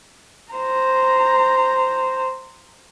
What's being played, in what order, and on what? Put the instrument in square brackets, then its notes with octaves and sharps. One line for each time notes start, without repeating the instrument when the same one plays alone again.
[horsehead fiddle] C5 A#5